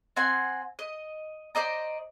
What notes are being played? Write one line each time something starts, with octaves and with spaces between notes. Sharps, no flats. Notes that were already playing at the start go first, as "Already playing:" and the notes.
C4 F#5 G#5 C6
D#5
C5 D5 D#5 A#5